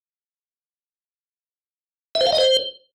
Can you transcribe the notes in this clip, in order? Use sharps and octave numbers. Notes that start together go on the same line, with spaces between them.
E5
C5
F5
D#5
C5